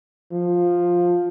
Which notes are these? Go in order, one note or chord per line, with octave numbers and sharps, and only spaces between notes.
F3